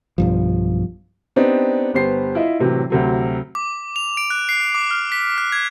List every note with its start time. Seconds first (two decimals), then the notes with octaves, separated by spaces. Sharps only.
0.18 B1 G2 F3
1.36 B3 C4 D4 D#4 G4
1.94 G1 B3 G4 C5 C7
2.35 E4 F4 D#5 E5
2.59 A2 C3 E3 F#3
2.90 D2 C3 F#3
3.55 D6
3.96 F7
4.17 D7
4.30 F#6
4.49 C7
4.75 D6
4.91 F6
5.12 B6
5.38 F#6
5.52 G#6